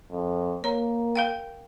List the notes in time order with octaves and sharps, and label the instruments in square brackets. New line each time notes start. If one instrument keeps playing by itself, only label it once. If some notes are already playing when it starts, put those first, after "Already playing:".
[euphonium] F2
[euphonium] A#3 [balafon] C#5 A#5
[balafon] A#4 F5 G5